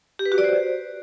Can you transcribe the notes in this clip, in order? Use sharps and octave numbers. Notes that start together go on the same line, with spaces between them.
G4
B4
F#4
D5
C5